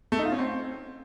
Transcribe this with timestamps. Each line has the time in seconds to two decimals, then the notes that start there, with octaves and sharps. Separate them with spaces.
0.12 A3
0.19 D#4
0.25 F4
0.32 C#4
0.39 C4